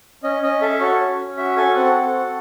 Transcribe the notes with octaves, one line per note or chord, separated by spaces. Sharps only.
C#4 D#5
C#4 D#5
A4 E5
F#4 C#5
C#4
C#4
F#4 E5
A4 G#5
C4 F#5
A4
F#4